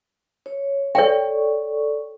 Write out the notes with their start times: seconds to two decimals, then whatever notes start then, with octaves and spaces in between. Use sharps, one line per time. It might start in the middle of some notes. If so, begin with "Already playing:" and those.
0.46 C#5
0.95 A4 C#5 D5 G5 C#6